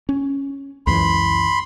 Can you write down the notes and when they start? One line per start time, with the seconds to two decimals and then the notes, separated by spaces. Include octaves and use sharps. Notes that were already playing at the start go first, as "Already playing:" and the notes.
0.09 C#4
0.87 C#2 F#2 E3 B5 C6